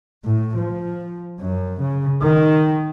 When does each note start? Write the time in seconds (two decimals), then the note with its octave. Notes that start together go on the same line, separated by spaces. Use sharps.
0.25 A2
0.56 F3
1.40 F#2
1.82 C#3
2.22 D#3